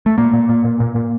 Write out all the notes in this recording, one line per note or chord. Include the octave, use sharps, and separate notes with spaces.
A3
A#2 A#3
A#2
A#2
A#2
A#2
A#2